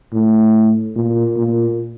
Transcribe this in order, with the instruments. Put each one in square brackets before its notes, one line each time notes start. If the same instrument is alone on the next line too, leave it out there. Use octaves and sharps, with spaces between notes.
[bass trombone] A2
A#2
A#2